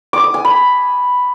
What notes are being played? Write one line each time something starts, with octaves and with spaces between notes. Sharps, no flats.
D6
D#6
G#5
B5